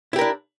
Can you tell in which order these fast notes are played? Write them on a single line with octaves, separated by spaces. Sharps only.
E4 G4 A#4 D4